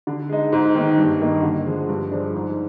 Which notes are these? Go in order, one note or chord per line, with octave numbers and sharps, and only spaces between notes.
D3
G#3 D#4
G#2
D#3 A#3 D#4
G2
D#3 A#3 D#4
D3
F3 G#3
G2
F3 G#3 D4
G#2